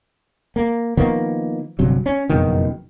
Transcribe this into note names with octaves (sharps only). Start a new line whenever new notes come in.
A#3
D#3 F3 A#3 B3
G1 G2 C3 F#3
C#4
F#1 F2 B2 D#3